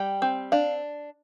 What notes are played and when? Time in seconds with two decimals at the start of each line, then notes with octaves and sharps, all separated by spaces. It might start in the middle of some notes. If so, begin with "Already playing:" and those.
Already playing: G3 G5
0.22 C4
0.52 D4 F5